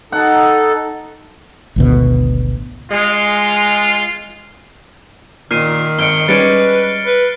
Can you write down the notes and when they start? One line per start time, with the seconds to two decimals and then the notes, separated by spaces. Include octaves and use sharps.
0.12 D#4 A4 F#5
1.76 G#1 D2 B2
2.92 G#3 F4
5.51 A#2 D#3 F6 C7 D#7
5.99 G#1 C#7 D7 G7
6.28 G3 G#3 C#4 B4 A6 C#7 D7
7.04 B4